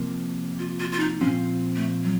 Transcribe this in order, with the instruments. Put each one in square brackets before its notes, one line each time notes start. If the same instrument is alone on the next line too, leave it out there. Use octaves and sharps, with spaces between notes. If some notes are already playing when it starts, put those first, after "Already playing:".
Already playing: [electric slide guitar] C3 F3 A#3
[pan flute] F4
F4
F4
D#4
[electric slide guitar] A#2 F3 C4 F4 [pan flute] C#4
[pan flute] A3
F#3